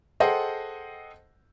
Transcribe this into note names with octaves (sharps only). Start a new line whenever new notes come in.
G#4 A4 C5 D#5 F#5 G5